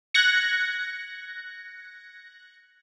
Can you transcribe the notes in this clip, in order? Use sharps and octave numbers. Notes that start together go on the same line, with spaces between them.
F#6 G#6 A#6 C#7